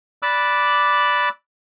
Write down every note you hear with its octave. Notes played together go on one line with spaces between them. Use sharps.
D5 B5 D6 E6 F#6